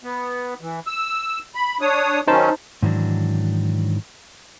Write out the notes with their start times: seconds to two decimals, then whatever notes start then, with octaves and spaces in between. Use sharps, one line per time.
0.03 B3
0.61 E3
0.87 E6
1.55 B5
1.81 D4 C#5 D#6
2.27 D#3 F#3 C#4 D#4 C5 A5
2.82 G#2 D#3 E3 F#3 D4